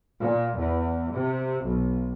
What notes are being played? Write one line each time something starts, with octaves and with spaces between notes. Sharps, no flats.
A#2
E2
C3
B1